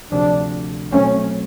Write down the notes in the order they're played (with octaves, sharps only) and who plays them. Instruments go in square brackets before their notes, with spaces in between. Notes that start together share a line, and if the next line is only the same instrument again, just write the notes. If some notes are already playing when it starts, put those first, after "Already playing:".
[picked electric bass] D2 C3 F3 [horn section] D4
[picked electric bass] B2 F#3 A3 C4 [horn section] C#4